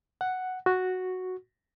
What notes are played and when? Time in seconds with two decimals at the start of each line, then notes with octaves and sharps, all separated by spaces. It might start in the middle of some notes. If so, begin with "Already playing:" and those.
0.21 F#5
0.66 F#4